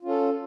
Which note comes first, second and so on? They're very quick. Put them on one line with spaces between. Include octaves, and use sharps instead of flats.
F4 C#4 A4